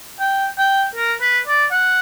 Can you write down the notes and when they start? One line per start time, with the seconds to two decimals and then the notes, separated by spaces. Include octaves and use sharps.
0.20 G5
0.58 G5
0.95 A#4
1.21 B4
1.47 D5
1.72 F#5